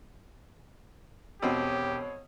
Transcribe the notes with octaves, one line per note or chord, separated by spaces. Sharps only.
E1 B2 C4 F#4 G4 C#5